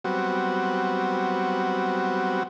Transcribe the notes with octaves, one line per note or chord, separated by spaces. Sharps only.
F#3 G3 B3 C4 F#4